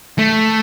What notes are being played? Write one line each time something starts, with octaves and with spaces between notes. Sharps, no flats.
A3